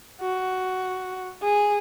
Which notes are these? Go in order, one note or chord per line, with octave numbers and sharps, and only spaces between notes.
F#4
G#4